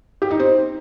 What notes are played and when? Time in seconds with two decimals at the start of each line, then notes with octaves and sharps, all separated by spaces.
0.22 G4
0.31 D#4
0.39 C4